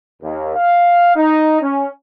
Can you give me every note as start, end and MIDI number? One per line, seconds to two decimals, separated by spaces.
0.22 0.54 39
0.56 1.14 77
1.15 1.59 63
1.62 1.86 61